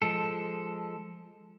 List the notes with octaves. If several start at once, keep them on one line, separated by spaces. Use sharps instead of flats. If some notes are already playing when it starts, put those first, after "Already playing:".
F3 G#3 A4